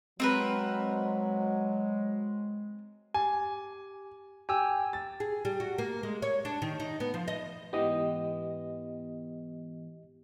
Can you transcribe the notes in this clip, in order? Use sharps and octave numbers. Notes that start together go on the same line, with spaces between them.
F#3 G#3 C4 A#4 B4
G4 G#5
G4 G#5 E6
A6
G#4
G3
F#4
A#3
G#3
C#5
D4
D#3
D#4
B3
F3
D#5
G#2 E3 B3 G4 D#5